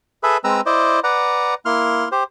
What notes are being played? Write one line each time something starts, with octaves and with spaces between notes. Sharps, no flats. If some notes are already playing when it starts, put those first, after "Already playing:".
G#4 A4 B4 E5 B5
G#3 C4 B4 A#5 E6
E4 C5 D5 D#5
B4 D5 F#5 A#5
A#3 E4 C6 F6
G4 C5